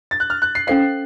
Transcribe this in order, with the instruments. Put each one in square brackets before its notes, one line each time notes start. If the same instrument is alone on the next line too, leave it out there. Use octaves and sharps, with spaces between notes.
[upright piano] A6
F#6
F6
F#6
C7
[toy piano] C#4 A4 C5 F5 [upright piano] C7